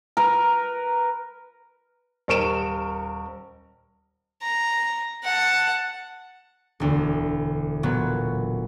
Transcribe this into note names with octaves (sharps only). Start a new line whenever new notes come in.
A#4 B4
D#1 A#4 C#6 D7 E7
A#5
F#5 A5
E1 D2
A#2 F#3 B3